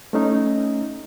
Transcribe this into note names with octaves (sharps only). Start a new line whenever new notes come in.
A3 C#4 D#4